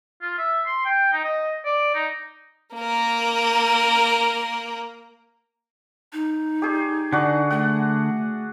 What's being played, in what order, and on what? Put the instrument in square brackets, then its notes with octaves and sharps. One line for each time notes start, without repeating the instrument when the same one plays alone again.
[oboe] F4
E5
C6
G5
D#4
D#5
D5
D#4
[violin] A#3 A#4
[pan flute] D#4
[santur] G4 G#4 C#6
[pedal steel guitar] D3 [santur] F#4 D5 F#5
[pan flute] A3 [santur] F#5